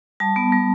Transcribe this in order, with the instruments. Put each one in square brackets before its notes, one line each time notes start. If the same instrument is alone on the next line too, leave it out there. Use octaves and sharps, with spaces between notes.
[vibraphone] G3 A5
B3
G3